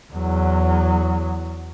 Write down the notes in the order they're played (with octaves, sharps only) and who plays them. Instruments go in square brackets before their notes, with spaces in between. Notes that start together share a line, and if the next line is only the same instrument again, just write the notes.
[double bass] E2 F#3